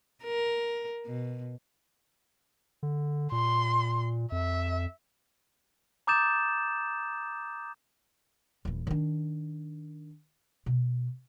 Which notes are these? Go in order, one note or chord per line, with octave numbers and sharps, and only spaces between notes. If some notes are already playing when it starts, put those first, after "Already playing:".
A#4
B2
D3
A#2 C6
F2 E5
A#5 D6 D#6 G6 A6 E7
D#1 E3
D#3 D4
B2